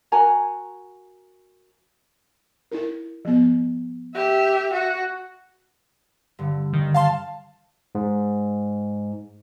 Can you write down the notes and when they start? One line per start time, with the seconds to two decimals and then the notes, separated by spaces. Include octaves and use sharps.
0.12 F#4 A#4 G#5 A#5
2.72 D#4 E4 A#4
3.25 F3 B3
4.15 G4 E5
4.73 F#4 E5
6.39 G2 D3
6.73 D#3
6.94 F5 A5 C6
7.95 G#2